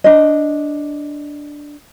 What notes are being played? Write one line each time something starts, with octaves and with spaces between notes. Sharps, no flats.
D4 D#5